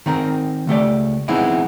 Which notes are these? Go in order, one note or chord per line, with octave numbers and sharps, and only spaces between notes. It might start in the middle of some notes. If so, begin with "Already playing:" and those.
D#3 C4 A#4
C#2 A3 G4 D5
E3 G#3 B3 C4 D#4 E4